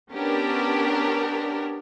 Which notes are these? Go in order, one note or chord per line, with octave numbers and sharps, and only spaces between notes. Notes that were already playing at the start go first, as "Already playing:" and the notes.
B3 C#4 D4 G4 A#4